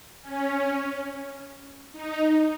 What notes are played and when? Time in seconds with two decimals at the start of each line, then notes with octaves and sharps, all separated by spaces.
0.22 C#4
1.92 D#4